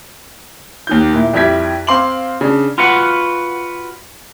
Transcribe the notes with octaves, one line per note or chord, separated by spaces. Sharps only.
D#2 D#3 G6
A#2 E4
F2 G3 E4 G4 G#6 B6
C4 F5 C6 D6 F#7
C#3 D4
F4 F#4 B4 F#5